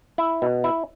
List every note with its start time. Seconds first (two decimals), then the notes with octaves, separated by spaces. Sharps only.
0.18 E4
0.42 B2
0.64 E4